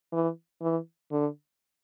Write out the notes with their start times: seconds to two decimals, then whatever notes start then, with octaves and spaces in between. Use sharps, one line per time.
0.12 E3
0.62 E3
1.11 D3